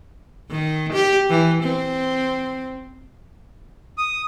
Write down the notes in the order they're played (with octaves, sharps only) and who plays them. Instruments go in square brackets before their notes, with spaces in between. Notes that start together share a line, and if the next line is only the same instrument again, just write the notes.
[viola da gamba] D#3
G4
E3
C4
[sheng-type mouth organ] D#6